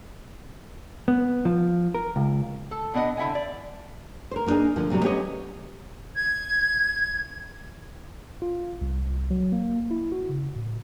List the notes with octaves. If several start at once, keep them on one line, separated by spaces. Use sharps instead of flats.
B3
F3
A#4
C#2
A4
B2 B3 D4 D5 D#5 F#5
D3 E4 E5 F#5 G#5
D5
A#4 C5
A#3 B3 D4 D#4 G#4
D3 F3 A#3
A2 C3 F#3 G3
B3 C#4 G4 A4 C#5 D#5
G#6
F4
C2
F#3
A#3
E4
F#4
C#3
A2